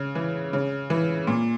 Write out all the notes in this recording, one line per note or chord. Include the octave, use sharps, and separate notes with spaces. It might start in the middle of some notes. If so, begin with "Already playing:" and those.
Already playing: C#3
E3
C#3
E3
A#2